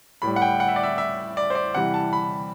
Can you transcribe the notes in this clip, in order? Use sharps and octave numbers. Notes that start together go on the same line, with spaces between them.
A2 G3 B5
F#5
G5
F#5
E5
D5
E5
E5
D5
C5
D5
C3 E3 G3 F#5
A5
B5